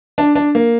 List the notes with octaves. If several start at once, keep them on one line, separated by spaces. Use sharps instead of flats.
D4
D4
A#3